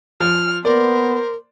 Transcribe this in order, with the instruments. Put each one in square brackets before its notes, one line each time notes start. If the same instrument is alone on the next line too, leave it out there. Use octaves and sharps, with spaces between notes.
[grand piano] F3 [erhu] F6
[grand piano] A#3 D5 [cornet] B3 [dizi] A#4 [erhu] C5